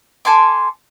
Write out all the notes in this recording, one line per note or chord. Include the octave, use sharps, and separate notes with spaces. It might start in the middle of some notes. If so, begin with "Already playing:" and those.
A4 G#5 C6 D6